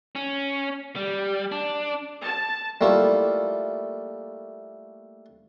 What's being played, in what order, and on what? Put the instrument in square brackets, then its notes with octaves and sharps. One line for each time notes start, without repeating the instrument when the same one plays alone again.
[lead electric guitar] C#4
G3
D4
[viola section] A5
[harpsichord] G3 A3 A#3 E4 F4